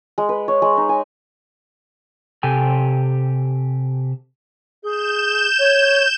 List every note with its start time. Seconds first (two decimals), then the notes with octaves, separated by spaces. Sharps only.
0.18 G#3
0.29 B4
0.48 C#5
0.62 G#3
0.77 D#4
0.89 G#5
2.43 C3 G4 A4 G5 G#5
4.83 G#4 G6 E7
5.59 C#5